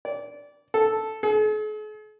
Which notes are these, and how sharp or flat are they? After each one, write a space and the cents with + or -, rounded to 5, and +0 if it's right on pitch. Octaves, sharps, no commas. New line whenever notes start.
D5 -25
A4 -5
G#4 +45